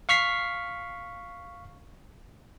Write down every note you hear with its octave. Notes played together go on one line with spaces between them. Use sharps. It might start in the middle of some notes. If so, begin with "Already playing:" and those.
F5 C#6 F6 B6 C7